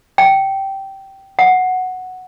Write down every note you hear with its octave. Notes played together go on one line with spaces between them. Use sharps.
G5
F#5